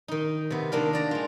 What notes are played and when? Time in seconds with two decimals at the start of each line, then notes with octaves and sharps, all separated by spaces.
0.08 D#3 D#4
0.50 C3 B3
0.72 D#3 A#3 D4 F4
0.93 D4 D5 A#5
1.11 G#3 F4